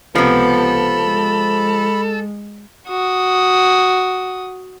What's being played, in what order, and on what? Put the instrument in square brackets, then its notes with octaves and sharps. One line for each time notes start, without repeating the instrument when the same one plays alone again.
[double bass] C#2 B3 [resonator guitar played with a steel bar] C3 F3 [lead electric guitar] A4 [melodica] B5
[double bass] G#3
[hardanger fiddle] F#4 D#6